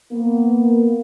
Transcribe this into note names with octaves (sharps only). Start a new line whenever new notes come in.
A#3 B3